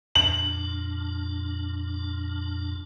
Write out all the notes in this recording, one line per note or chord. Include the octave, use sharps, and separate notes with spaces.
F2 A#2 D4 F#7